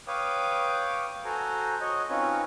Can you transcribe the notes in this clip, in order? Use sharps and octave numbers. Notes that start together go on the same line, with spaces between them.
B4 C#5 F5 G5 D6 D#6
F#4 A4 C5 G#5 A#5
F#4 C#5 D#5
C4 C#4 D#4 F4 B4 C#5